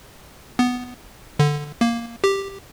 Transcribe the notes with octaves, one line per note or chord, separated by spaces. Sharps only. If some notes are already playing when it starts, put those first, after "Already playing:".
B3
D3
A#3
G4